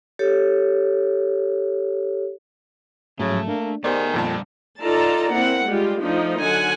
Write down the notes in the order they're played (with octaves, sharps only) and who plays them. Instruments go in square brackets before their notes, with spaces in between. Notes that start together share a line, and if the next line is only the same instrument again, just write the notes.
[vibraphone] G4 A4 C#5
[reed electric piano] G#2 F3 F#3 [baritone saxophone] C#3 [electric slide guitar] A3
[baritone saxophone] A#3 [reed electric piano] D4
[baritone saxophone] D#3 [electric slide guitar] A3 G#4 G#5 [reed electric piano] B3 [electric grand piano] G4 C5 D5
[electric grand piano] F2 A#2 A5 [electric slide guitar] D3 G3
[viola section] D#4 F4 A4 D5 A5 A#5
A#3 C4 E4 F#5
G3 G#3 F4 G4
F3 A3 D4 D#4 F4
D3 F#3 F#5 G#5